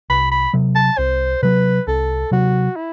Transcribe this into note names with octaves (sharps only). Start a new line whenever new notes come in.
C2 B5
B5
C3 F#3
A5
C2 C5
C3 F#3 B4
C2 A4
C3 F#3 F#4
E4